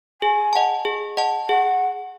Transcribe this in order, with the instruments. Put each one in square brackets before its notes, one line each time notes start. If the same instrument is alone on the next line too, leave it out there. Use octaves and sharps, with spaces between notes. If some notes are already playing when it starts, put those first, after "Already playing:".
[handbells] G#4 [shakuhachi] G#5
[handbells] D#5 F#5 A5
G#4
D#5 F#5 A5
[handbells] G#4 [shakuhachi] F#5